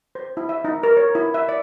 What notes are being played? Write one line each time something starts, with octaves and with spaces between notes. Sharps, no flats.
C5
E4
E5
D#4
A#4
C#5
E4
E5
D5